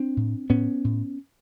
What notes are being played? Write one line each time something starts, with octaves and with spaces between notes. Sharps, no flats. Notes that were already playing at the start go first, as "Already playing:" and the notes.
Already playing: C4 D4
A2
A2 B3 C#4
A2